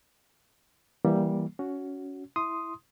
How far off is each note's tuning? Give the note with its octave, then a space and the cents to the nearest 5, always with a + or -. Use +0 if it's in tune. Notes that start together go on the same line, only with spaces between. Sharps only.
E3 +0 G3 +0 A#3 +20
C#4 +15 F#4 +0
E4 +0 C6 +0 D#6 +0